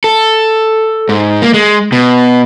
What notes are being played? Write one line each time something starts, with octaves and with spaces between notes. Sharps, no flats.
A4
G#2
A#3
G#3
B2